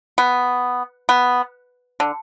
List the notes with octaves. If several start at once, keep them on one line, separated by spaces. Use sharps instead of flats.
B3
B3
D3